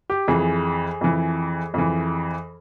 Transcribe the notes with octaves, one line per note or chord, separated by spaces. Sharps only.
G4
F2 E3 G#4
F2 E3
F2 E3